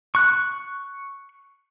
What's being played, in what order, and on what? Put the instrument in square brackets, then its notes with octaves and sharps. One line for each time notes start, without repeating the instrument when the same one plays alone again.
[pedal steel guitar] C#6 F#6